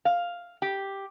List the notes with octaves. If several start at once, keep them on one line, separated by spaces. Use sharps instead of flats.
F5
G4